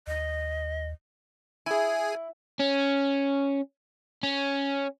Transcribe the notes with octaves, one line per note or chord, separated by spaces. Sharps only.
D#2 D#5
E4 G#4 G#5
C#4
C#4